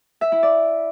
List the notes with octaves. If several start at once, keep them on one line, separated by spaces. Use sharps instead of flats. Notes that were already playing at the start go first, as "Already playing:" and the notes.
E5
E4
D5